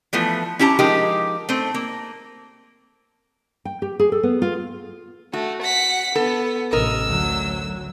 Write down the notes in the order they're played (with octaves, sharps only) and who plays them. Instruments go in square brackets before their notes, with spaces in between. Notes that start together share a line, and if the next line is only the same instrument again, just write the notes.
[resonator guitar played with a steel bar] E3 F3 A3 B3
C#4 E4 G4 A5 A#5
F3 G#3 D#4 G4 A#4
A3 C4
A#3
[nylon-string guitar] G5
G4
G#4
A4
B3
F4
[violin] A3 [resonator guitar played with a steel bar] F#4
[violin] F#5 B6
[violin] B3 [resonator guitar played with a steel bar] A4
[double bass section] A1 C3 [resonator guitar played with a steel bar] A#4 D#5 [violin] E6
[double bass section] D2 F#3